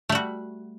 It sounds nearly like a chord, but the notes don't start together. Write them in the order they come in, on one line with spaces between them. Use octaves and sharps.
A3 G3 F#4